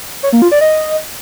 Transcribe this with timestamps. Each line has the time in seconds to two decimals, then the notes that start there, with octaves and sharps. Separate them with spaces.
0.23 C#5
0.33 A#3
0.42 F4
0.52 D5
0.61 D#5